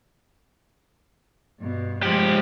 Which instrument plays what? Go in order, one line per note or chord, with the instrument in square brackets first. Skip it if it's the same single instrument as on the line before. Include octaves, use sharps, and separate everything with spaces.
[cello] G2 B2
[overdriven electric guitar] F3 G4 [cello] G#3